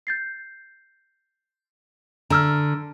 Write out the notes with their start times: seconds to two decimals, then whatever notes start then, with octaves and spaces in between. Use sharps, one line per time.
0.07 G6 A6 C7
2.30 D3 A#5 E6 F6